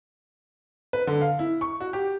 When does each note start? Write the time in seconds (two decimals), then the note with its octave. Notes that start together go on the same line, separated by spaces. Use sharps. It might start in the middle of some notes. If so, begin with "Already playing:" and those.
0.93 B4
1.07 D3
1.21 F5
1.39 E4
1.61 C#6
1.80 F#4
1.93 G4